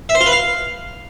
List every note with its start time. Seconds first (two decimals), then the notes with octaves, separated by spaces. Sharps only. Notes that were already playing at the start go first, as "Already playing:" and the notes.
0.09 E5
0.15 C5
0.21 F4
0.26 B4
0.32 F5